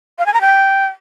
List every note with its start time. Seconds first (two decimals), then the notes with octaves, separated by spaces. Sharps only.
0.19 F5
0.26 G#5
0.34 A#5
0.41 G5